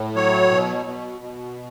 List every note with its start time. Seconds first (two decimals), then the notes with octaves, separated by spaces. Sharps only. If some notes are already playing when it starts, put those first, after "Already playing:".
Already playing: A2
0.15 F#3 C#5
0.51 B2
0.86 B2
1.21 B2